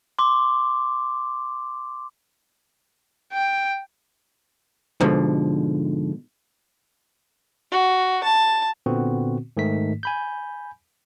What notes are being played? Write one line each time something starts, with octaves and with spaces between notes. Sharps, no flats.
C6 D6
G5
G#2 B2 D3 F3
F#4
A5
A#2 D3 B3 C4 F#4
G#2 D#3 A3 B6
G#5 B5 G6